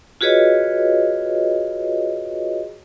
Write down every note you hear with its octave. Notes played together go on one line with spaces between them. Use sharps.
F4 F#4 G#4 B4 C#5 D#5